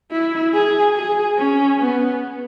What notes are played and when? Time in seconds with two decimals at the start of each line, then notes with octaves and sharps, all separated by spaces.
0.11 E4
0.53 G#4
0.95 G#4
1.37 C#4
1.80 B3